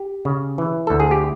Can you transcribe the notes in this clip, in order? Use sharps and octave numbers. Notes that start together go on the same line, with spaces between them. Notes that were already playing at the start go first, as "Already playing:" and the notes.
Already playing: G4
C#3
E3
D2 A4
G#4
G4